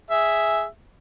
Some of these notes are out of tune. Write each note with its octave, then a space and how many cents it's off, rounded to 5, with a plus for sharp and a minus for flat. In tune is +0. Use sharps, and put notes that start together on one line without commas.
G#4 +0 E5 +0